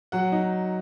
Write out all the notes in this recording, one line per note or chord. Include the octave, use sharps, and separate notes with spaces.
F#3 F#5
D#4